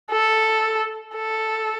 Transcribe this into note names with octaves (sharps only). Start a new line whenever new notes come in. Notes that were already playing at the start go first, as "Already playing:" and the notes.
A4
A4